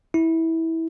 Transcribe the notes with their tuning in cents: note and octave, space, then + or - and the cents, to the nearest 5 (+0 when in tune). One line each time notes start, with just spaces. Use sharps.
E4 -20